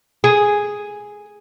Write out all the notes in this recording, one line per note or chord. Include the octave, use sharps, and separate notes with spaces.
G#4